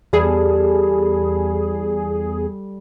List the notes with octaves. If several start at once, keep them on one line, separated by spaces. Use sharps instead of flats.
E2 G3 G#4 A4